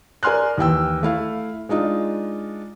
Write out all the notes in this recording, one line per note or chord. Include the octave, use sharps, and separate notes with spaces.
A#4 D5 G#5 C6 F6 F#6
D#2 E3 G5 E6
A3 E4 F5
G#3 D4 D#4 F4